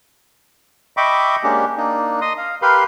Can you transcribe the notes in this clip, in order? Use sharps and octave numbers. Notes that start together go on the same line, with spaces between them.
D#5 E5 G5 B5 C#6 D6
G#3 A#3 C#4 D4 G4
A#3 D4 D#4
D#5 C6 D#6
F5
G4 A#4 B4 F5 B5 C6